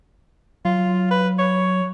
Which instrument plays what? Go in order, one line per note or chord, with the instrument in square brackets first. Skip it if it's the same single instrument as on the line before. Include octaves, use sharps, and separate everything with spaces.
[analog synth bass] F#3 [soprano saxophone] F4
[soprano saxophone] B4
C#5